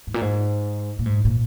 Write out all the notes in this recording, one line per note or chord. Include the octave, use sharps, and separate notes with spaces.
G#2
A#2
G#2
A#2
G#2
A#2